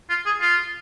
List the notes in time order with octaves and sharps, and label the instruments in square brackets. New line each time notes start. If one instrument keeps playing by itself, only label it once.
[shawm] F4
G#4
F4